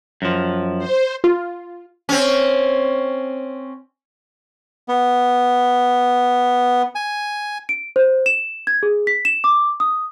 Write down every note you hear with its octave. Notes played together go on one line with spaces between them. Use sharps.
F#2 F3
C5
F4
C4 C#4
B3
G#5
D7
C5
E7
G#6
G#4
B6
E7
D6
D#6